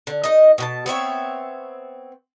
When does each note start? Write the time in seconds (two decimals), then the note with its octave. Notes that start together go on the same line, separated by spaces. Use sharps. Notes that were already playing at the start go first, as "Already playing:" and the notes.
0.07 D3
0.24 D#4 D#5
0.58 B2 F#4 A5
0.86 B3 C4 C#5 E5